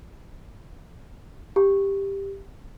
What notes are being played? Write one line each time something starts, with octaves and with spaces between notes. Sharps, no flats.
G4